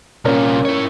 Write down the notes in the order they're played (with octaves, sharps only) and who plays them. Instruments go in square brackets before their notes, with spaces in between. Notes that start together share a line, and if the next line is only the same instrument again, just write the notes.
[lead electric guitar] C2 A#2 [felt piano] C#4 A#4
[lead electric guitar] E4 C#5